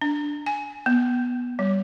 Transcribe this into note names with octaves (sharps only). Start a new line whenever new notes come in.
D4
G#5
B3
G3